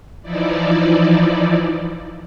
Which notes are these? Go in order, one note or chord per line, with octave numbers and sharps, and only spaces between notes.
E3 F3 D#4 E4 D5